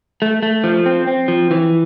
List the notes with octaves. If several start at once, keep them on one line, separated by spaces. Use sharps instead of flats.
A3
A3
F3
C4
C4
F3
E3